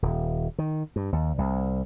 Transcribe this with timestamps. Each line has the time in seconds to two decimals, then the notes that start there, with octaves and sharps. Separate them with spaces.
0.02 D#1
0.58 D#3
0.96 G2
1.12 D#2
1.38 C2